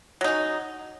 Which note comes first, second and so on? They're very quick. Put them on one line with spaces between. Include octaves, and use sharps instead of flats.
F#3 D#4 C#4